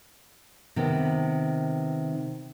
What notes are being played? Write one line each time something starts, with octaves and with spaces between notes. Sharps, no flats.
C3 D#3 B3